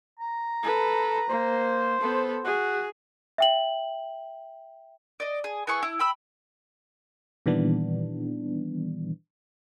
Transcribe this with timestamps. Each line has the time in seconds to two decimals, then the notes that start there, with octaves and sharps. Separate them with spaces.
0.19 A#5
0.64 A4 B4
1.30 A#3 C5
2.01 B3 A4
2.45 F#4 G#4
3.38 E5 G5 F#7
5.20 D5 D#5
5.44 G#4
5.67 B3 E4 G#4 C#6
5.83 E4
5.99 G5 B5 E6
7.46 A#2 D#3 E3 G3 B3 D4